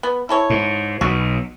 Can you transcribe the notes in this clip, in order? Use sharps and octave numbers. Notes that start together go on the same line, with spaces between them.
B3
E4 A4 C#5
G#2
B1 B2 F#4